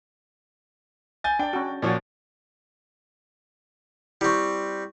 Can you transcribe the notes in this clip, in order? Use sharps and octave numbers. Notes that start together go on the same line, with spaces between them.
G#5 G6 A6
D4 D5 G5
C#4 F#4
A#2 F3 F#4 C#5 D5
G3 C4 E4 C#6